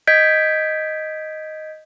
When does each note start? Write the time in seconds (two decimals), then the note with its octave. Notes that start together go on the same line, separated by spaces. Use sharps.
0.07 D#5 G6 G#6 B6 D7